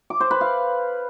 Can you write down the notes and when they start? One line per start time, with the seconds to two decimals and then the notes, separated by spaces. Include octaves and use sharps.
0.10 D6
0.20 C5
0.31 B4
0.41 F5